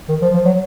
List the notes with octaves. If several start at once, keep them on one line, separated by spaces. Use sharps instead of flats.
D#3
F3
F3
F#3